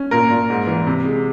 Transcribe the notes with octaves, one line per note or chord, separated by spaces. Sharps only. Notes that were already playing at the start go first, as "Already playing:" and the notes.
Already playing: C#4
A#2 A#4
A#2
G#2
E3
C3
G#3